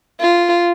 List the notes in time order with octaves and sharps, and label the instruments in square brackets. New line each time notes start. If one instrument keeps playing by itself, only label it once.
[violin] F4